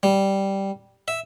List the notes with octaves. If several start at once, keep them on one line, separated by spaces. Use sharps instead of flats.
G3
E5